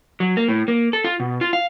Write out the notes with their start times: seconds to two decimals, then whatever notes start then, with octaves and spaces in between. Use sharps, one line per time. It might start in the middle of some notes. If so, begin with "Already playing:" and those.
0.20 F#3
0.37 A#3
0.48 A2
0.68 A#3
0.93 A4
1.04 F4
1.20 B2
1.41 F4
1.53 F5